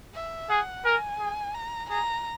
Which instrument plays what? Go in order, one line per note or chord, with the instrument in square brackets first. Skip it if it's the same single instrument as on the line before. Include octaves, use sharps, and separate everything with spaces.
[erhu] E5
[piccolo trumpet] G#4 [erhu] F#5
[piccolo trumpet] A#4 [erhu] G#5
[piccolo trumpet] G#4
[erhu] A#5
[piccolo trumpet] G#4 [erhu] A#5